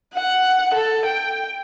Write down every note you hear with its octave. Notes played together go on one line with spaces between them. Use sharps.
F#5
A4
G5